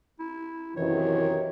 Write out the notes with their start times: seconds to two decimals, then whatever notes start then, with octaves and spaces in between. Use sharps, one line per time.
0.19 E4
0.77 F#2 C3 D#3 E3 C#5